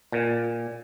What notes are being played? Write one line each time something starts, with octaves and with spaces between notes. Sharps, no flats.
A#2